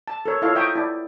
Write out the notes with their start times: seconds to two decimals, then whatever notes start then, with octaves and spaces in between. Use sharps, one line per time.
0.08 A5
0.26 A4 A#4 C#5
0.42 E4 F4 A4 C#5 D#5 F5
0.55 D#5 E5 G5 A#5 C#6 D#6
0.75 E4 D5